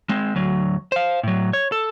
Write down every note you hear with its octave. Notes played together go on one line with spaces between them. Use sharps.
G#3 C4
D2 F#3
C5 F5
A2 F#3
C#5
A4